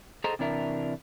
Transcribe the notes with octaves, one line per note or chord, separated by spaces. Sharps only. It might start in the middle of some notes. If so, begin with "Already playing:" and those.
G#4 A4 C5 D#5 A#5
C3 E3 D4 A#4 E5